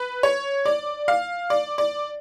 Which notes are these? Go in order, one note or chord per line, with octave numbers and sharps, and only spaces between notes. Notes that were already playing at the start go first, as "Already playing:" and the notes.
Already playing: B4
C#5
D5
F5
D5
D5